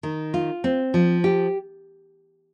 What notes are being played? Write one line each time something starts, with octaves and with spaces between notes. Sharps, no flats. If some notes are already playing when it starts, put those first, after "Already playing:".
D#3
F4
C4
F3
G4